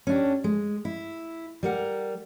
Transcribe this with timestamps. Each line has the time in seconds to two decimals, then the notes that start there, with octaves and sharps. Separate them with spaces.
0.07 C#4 D4 G4
0.44 G#3
0.85 E4
1.63 G3 A#4 F#5